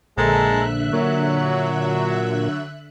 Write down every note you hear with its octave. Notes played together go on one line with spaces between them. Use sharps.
A#1 D3 G#3 A4 E5 A#5 F#6
A#2 F#3